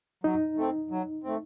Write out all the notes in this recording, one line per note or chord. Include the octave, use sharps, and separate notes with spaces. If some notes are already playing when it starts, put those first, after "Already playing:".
F#3 D#4
A3 C4
F#3
A3 C4